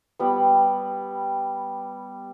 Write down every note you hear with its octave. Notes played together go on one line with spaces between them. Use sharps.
G3 B3